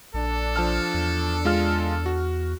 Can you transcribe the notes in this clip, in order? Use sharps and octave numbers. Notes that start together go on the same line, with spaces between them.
A#1 D4 A4
F3 A5 F6
E2
G#3 F4 F6
F#4